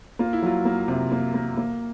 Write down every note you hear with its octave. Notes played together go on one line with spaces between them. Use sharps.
A#3 F4
E4
F#3 F4
A#3
C3
A#3
A#3
A#3